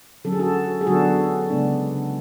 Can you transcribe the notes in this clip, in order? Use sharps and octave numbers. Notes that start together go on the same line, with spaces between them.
D3 F#3 C#4 A4
G#4
F#4 A4
G#4
D3 F#3 B3 D4 F#4 A4
C#3 G#3 B3 D4